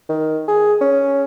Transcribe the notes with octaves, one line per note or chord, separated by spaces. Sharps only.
D#3
G#4
C#4